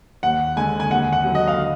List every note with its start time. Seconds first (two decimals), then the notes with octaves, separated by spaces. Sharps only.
0.23 D#2 F#5
0.56 D3 G#3 G#5
0.80 G#5
0.91 D#2 F#5
1.13 F#5
1.24 D3 F#3
1.35 D#5
1.48 F5